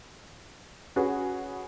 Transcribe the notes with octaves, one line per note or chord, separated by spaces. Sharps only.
C#4 F#4 G#4 B4